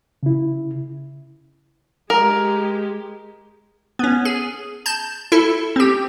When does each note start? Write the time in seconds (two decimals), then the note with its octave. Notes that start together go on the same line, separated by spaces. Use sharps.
0.23 C#3 E4
2.10 G#3 G4 A#4
3.99 B3 C#4
4.25 G#4
4.86 A5 G6
5.32 E4 A4
5.76 C4 G4